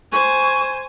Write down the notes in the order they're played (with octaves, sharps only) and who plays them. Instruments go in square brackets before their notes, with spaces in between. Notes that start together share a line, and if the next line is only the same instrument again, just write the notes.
[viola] C5 G#5 [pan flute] C#6